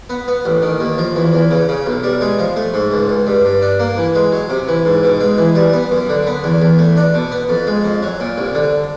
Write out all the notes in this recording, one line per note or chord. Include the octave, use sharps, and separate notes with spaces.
B3
B3
A1
D#3
D#2
F3
E2
E2
C#3
C#3
B1
G3
G#3
F3
A3
G#2
C#2
C#2
G2
G2
D4
A#3
E3
G#3
F#3
C3
E3
G#2
B2
G#3
E3
G3
B3
F#2
D3
B3
E2
E2
A3
D4
B2
B3
F2
G#3
F2
F#3
A#2
C2
D3